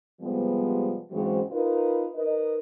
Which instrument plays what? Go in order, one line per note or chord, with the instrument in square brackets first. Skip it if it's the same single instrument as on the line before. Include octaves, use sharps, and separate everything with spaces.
[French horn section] C3 F3 G3 G#3 B3
G#2 C#3 E3 F#3 G#3 C4
D#4 F4 A#4 B4
D#4 A#4 B4 D#5